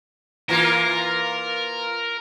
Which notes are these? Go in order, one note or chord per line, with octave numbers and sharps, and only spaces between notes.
E3 A#3 F4 A#4